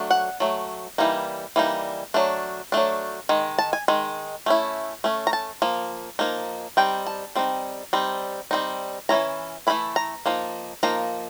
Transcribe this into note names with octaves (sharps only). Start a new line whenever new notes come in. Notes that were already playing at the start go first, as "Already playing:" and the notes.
Already playing: F#3 A3 D4
F#5
F#3 A3
E3 G3 A#3 D#4
E3 G3 A#3 D#4
F#3 A3 D4
F#3 A3 D4
D#3 G#3
A5
G#5
D#3 G#3
A3 C#4 E4
A3 C#4
A#5
A5
F3 A#3
F3 A#3 D#4
G3 C4 D#4 G5
A5
G3 C4 D#4
G3 C4 D#4
G3 C4 D#4
E3 A3 C#4 E4 A#5
E3 A3 C#4 E4 B5
A#5
F3 A#3 D#4
F3 A#3 D#4 A#5